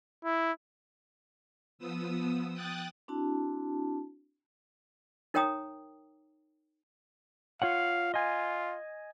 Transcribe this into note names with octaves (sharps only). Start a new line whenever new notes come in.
E4
F3 B3 D#6 E6
G5 D#6 F#6 A6
C4 D4 E4 F#4 A5
D#4 A#4 C#5 G5 A#5 D#6
F4 C#5 F5 F#5
F4 D#5 G#5